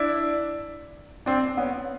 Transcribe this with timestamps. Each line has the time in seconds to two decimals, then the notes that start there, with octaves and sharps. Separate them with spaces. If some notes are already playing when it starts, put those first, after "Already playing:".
Already playing: D4 E4
1.26 C4 D4
1.58 B3 C#4